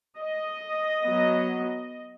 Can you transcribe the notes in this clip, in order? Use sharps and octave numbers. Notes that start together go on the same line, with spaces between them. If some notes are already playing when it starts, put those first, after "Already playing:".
D#5
F#3 B3